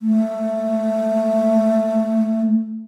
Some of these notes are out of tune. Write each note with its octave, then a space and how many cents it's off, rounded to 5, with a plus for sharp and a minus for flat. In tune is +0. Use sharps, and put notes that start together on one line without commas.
A3 +5